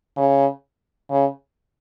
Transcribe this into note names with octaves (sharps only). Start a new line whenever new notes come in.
C#3
C#3